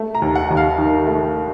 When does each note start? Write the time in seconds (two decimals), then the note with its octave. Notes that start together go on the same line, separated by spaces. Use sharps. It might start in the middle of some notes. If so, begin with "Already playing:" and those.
Already playing: A3
0.15 A#5
0.22 D#2
0.35 F#5
0.49 D#2 F#5
0.57 F5
0.78 D#3
1.07 A3